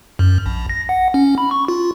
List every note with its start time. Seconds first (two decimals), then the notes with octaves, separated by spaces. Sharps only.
0.19 F#2
0.46 A#1
0.69 A#6
0.89 F#5
1.14 C#4
1.38 B5
1.51 C#6
1.68 F4